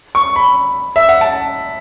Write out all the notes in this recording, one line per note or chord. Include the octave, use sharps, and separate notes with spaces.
C#6
B5
E5
F#5
A5